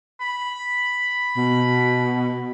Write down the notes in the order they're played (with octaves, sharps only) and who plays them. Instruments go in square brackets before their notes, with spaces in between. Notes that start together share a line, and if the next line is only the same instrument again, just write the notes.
[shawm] B5
[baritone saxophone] B2